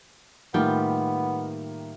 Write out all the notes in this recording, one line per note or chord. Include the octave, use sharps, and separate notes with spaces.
A2 D#3 G3 A#3 B3 F4 G4